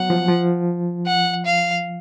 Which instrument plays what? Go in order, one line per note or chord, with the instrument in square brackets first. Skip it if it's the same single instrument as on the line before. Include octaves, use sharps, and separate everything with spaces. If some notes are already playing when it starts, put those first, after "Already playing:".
Already playing: [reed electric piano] F#3 B3 [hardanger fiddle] F#5
[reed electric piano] F3
F3
[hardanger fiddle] F#5
F5